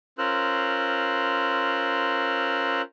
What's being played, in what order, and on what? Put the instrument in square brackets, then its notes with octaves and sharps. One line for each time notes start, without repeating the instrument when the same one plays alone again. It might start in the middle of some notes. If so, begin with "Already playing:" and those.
[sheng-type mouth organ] C#4 F4 A#4 C5 E6 F#6